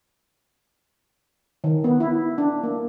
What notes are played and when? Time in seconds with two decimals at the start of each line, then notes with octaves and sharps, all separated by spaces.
1.64 D#3
1.84 B3
2.00 E4
2.38 D4
2.63 A#3